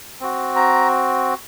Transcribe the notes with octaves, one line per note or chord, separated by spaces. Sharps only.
C4 F#4
A#5